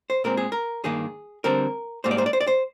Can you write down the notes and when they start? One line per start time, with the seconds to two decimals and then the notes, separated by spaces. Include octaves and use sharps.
0.10 C5
0.24 A#2 G#3 C4 A#4
0.37 G#4
0.52 A#4
0.84 G2 D#3 A#3 G#4
1.44 D3 G3 C4 A#4
2.04 G#2 G3 A#3 C5
2.11 D5
2.18 C5
2.26 D5
2.33 C5
2.41 D5
2.47 C5